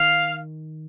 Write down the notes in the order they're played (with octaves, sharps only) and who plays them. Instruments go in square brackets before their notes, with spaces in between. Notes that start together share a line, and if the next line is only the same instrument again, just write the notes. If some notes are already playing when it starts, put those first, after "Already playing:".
Already playing: [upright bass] D#3 [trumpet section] F5